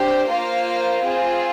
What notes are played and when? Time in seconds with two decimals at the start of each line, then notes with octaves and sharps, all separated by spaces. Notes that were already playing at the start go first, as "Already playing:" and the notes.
Already playing: D4 G4 C5 G5
0.28 A#3 F4 C5 F5
1.04 C4 F4 G#4